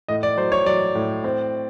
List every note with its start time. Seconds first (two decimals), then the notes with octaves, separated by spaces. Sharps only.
0.08 A2 D#5
0.23 D5
0.37 F#3 C5
0.52 C#5
0.66 F#3 D5
0.95 A2
1.24 C4